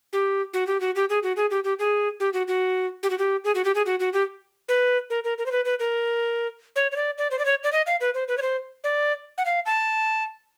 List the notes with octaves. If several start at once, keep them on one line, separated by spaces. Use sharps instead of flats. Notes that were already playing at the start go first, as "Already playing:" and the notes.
G4
F#4
G4
F#4
G4
G#4
F#4
G#4
G4
G4
G#4
G4
F#4
F#4
G4
F#4
G4
G#4
F#4
G4
G#4
F#4
F#4
G4
B4
A#4
A#4
A#4
C5
B4
B4
A#4
C#5
C#5
D5
D5
C5
D5
C#5
D5
D#5
F5
B4
C5
B4
C#5
C5
D5
F#5
F5
A5